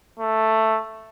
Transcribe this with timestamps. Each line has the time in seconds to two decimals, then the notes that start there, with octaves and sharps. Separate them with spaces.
0.19 A3